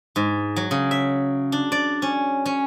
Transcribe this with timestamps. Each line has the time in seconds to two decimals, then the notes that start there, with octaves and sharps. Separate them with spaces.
0.16 G#2
0.56 F#3
0.71 C#3
0.91 E5
1.52 D4
1.72 D5
2.02 C#4
2.46 C#4